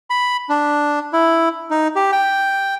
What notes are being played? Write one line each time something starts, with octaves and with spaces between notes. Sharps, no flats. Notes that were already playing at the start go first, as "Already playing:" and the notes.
B5
D4
E4
D#4
G4
G5